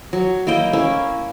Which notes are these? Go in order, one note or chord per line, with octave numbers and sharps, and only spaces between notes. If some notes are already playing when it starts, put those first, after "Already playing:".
F#3
A#3 E4 D#5 G5
A#3 C#4 E4